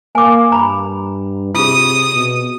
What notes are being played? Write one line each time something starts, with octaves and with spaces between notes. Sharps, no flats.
A#3 G#5 D6
G2 A#5 B5
C3 F4 G#4 D#6
B2